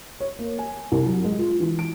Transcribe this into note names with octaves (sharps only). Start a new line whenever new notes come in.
C#5
A#3
G#5
C2
F#3
G#3
F4
E3
D7